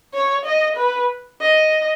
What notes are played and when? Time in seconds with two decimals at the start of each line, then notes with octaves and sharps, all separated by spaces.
0.14 C#5
0.45 D#5
0.76 B4
1.41 D#5